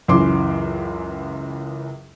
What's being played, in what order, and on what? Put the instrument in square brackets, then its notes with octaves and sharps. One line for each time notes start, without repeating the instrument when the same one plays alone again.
[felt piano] C#2 F#2 E3 C#4 C6 D6